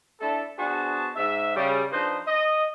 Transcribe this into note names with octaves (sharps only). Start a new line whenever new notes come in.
A3 D4 E4 A4
B3 D4 F#4 G#4 C5 A5
G#2 E5
C#3 G3
F3 D4 D#4 B4 C5 D#5
D#5